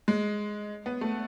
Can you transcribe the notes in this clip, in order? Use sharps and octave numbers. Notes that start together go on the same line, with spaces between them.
G#3
B3
A3